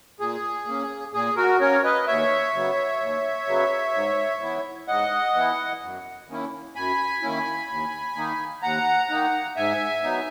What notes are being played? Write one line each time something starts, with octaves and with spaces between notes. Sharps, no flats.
A#2 G#4
A#3 C#4
A#2 G#4
F#4 A#4
A#3 C#4 A#4 C#5
B4 D#5
D#2 C#5 E5
C#3 F#3 B3
D#2
C#3 F#3 B3
G#2
E3 B3 E4
G#2 D#5 F#5
E3 B3 E4
F#2
D#3 A#3 C#4 E4
F#2 G#5 B5
D#3 A#3 C#4 E4
D#2
D#3 A#3 D#4
D#2 F#5 A#5
D#3 A#3 D#4
G#2 E5 G#5
F#3 B3 D#4